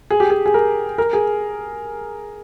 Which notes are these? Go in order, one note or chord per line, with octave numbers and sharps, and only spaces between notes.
G#4
G4
G#4
G#4
A#4
A#4
G#4